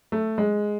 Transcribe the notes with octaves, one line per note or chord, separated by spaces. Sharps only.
A3
G#3